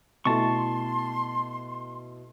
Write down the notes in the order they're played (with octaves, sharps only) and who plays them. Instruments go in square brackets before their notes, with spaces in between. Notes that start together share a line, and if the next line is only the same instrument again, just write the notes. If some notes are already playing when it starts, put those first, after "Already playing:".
[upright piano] B2 A3 E4 [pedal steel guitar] A5 C#6 [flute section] C6